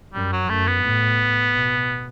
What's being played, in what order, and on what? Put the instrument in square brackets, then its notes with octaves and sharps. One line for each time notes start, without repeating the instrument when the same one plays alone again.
[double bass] F#2 [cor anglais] G3
[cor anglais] F#3
[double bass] F#2 [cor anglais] A3
[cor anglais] B3
[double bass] A2
B2